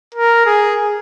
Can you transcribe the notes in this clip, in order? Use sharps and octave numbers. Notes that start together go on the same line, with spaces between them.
A#4
G#4